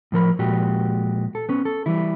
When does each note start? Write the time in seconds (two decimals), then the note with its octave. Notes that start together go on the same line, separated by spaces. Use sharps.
0.12 A2 F3 A#4 B5
0.39 A#2 F3 G#3 F#4 G4
1.35 A4
1.49 B3 C#4
1.65 A4
1.86 E3 G3 E4